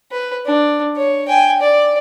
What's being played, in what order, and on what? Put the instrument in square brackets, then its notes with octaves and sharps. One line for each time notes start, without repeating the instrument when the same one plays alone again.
[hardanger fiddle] B4
D4
C#5
G5 G#5
D5